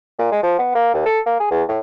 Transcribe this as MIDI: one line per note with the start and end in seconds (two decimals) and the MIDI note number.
0.18 0.29 46
0.31 0.39 56
0.43 0.54 53
0.58 0.72 59
0.75 0.90 58
0.94 1.02 39
1.05 1.20 69
1.26 1.38 58
1.40 1.49 68
1.51 1.63 40
1.68 1.79 45